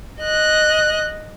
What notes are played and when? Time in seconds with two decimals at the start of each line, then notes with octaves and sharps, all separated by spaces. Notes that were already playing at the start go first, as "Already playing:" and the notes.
0.22 D#5 F#6